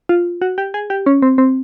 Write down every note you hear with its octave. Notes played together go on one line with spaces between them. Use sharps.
F4
F#4
G4
G#4
G4
C#4
C4
C4